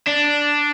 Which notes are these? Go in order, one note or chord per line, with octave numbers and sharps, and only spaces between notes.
D4